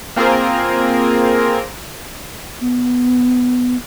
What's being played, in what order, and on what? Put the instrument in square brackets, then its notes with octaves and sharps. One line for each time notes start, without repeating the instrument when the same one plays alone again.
[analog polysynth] A#3 C4 F4 G#4 A#4
[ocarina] B3